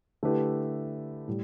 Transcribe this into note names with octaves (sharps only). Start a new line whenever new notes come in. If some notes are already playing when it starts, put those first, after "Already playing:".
D3 A3 E4 G4 B4
A2 G3